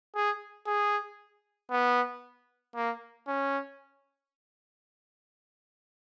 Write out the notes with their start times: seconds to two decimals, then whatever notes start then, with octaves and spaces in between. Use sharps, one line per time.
0.15 G#4
0.67 G#4
1.71 B3
2.76 A#3
3.28 C#4